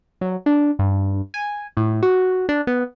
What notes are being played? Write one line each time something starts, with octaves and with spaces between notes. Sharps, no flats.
F#3
D4
G2
G#5
A2
F#4
D4
B3